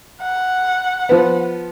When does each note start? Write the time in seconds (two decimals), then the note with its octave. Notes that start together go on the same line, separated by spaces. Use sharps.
0.21 F#5
1.09 F3 B3